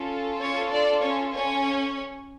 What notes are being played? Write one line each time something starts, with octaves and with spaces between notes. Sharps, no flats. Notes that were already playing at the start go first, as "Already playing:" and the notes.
Already playing: C#4 F4 A4
C#4 C#5
D4 D5
C#4 C#5
C#4 C#5